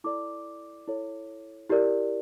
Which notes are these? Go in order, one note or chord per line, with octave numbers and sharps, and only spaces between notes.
E4 A4 D5 D6
E4 A4 C#5
E4 G4 A#4 D5